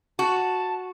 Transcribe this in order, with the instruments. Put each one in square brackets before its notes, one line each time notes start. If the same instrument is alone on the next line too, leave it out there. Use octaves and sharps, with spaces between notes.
[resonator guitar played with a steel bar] F#4 [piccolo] A5